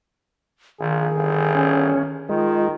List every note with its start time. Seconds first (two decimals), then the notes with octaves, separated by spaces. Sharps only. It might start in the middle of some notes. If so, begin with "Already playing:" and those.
0.80 A#1 D#3 G#4
1.16 G1
1.55 C#4
2.29 D#3 G#3 F4